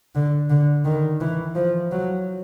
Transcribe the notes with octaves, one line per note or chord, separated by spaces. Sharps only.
D3
D3
D#3
E3
F3
F#3